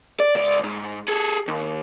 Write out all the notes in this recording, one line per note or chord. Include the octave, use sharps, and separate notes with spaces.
D5
C#2 D5
G#2
G#4 A4
D#2